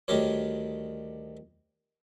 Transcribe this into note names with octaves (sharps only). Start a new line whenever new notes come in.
D2 D#3 G3 G4 A#4 C#5